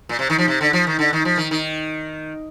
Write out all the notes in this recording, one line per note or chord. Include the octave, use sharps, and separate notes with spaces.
A#2
C3
D#3
F3
C3
D3
F3
D#3
D3
D#3
F3
D#3
D#3